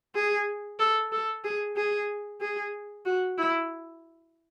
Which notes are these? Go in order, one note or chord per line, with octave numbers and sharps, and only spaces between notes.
G#4
A4
A4
G#4
G#4
G#4
F#4
E4